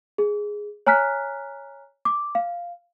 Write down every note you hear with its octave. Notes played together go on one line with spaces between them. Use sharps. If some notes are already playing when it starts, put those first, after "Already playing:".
G#4
C#5 G#5 A#5 F6 F#6 B6
D6
F5